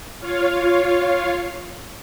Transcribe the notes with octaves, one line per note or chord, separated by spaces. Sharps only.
F4 C#5 F5